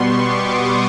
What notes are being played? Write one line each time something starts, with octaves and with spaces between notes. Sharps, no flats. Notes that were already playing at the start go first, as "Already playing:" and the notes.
Already playing: B2 G3 B3 C6 C#6
D6
D#6